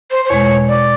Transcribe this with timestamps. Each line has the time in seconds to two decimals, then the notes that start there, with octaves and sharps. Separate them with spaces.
0.11 C5
0.25 C5
0.29 E2 B2 G#3 C#5
0.68 D5